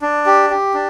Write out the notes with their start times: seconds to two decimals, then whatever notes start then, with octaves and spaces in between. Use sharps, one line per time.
0.02 D4
0.26 G4
0.50 G4
0.74 D4